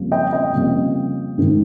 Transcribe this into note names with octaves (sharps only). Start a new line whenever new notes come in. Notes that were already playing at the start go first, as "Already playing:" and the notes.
Already playing: F2 C#3 G3 A#3 C#4
D#5 G5
D#5 G5
F2 C#3 G3 A#3 C#4
G#2 D#3 G#3